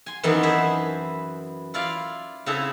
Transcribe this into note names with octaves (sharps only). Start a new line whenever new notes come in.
G#5 C6
F#2 D#3 E3 B3 C4 E4
G#4 B4 C5 E5 G#5 A5
E4 F4 D5 F5
C#3 C4 E4 G#4 A4